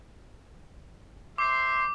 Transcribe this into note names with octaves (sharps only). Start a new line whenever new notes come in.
C5 E5 C6 D6